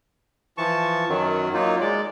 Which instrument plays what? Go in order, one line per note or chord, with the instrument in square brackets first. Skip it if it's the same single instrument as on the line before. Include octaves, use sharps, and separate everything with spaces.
[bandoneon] E3 F3 A5 C#6
F#2 D#3 F#3
F#3 A#3 D#4 F4
G#3 D5